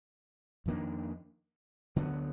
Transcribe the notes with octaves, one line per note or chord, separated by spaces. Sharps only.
F2 D#3 A#3 D4
D2 D3 F#3 B3